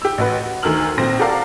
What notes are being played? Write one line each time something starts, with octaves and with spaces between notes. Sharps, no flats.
G4 E6
A1 F#4 B4
F#4
D2 D#3 A#4 E6 F6 F#7
A#1 C4 A#6
F#4 G4 A4 A#4 D5 F5